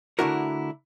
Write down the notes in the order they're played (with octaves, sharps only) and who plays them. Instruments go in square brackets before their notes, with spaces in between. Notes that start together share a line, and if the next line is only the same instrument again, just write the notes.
[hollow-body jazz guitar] D3 A3 D4 E4 F#4 A#4